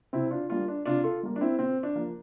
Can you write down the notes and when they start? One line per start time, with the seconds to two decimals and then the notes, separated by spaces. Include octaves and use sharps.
0.13 C3 C4 E4
0.31 D4 F4
0.49 G3 A#3 D4 F4
0.68 D4
0.86 C3 D4 F4
1.04 F4 A4
1.23 G3 A#3
1.36 D4
1.41 C4 E4
1.59 A#2 C4
1.83 D4
1.95 F3 A#3